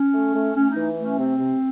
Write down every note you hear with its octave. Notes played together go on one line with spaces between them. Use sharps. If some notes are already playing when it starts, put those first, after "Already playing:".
Already playing: C#4
A3
A3
A3 C#4
D#4
E3
A3
C#4
C3 C4
C3